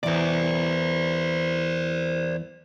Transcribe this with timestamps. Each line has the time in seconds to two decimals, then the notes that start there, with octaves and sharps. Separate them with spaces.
0.03 E2 E3 C5 D5